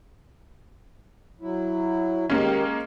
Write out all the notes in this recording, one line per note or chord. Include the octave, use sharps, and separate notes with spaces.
F#3 E4
D#3 G#3 A#3 C#4 G4